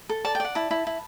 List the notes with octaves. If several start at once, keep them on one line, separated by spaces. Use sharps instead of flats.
A4
D5 A5
G5
D5 F#5
E4 A5
E4
E4